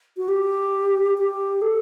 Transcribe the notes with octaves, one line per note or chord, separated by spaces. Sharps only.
F#4
G4
G4
A4